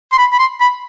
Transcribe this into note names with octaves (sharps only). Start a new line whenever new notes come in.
C6
B5
B5
C6
B5